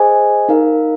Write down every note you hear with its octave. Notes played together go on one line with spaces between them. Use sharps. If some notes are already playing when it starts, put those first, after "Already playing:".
Already playing: G#4 C5 D#5 G#5
D#4 A#4 F5